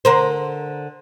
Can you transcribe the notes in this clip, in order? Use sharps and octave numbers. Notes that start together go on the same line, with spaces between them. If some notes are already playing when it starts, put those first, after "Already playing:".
D3 A#4 C5